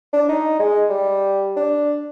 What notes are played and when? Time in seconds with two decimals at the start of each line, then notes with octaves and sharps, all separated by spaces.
0.13 D4
0.29 D#4
0.59 G#3
0.90 G3
1.56 D4